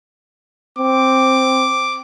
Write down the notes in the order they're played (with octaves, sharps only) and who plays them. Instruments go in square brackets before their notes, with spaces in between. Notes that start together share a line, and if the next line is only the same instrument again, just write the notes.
[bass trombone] C4 [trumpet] D6